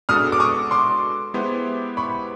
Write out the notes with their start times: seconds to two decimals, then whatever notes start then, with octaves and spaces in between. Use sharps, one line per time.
0.09 G#3 B3 D4 F#4 A4 D#6 F6
0.32 D6
0.40 C#6 D#6
0.71 C6 D6
1.34 G#3 B3 E4 G4 C5
1.97 B5 C#6